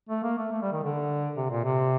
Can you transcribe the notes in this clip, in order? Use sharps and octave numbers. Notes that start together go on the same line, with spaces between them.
A3
A#3
A3
A3
G3
D#3
D3
C3
A#2
C3